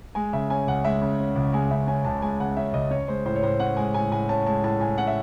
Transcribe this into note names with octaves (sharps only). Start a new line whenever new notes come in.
G#3 G#5
C#3 E5
C#4 G#5
C#2 F#5
G#3 E5
C#3
C#4
C#2
G#3 G#5
C#3 E5
C#4 G#5
C#2 A5
G#3 G#5
C#3 F#5
C#4 E5
C#2 D#5
C#4 C#5
G#3 C5
A2 C5
C#5
A2 C5
C#4 F#5
G#3 G#5
A2 G#5
A2 G#5
C#4 A5
G#3 A5
A2 A5
A2 G#5
C#4 F#5
E5